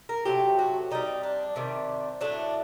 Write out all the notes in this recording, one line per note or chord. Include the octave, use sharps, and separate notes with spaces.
A#4
C3 F#3 A3 G4
F#4
C3 D#3 G3 D#4
D4
C3 D#3 G3
A2 F#3 A3 D4